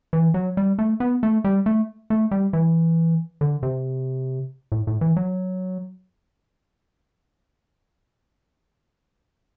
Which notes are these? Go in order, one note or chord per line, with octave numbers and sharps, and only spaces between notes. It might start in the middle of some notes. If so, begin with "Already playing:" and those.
E3
F#3
G3
A3
B3
A3
G3
A3
A3
G3
E3
D3
C3
A2
A2
E3
F#3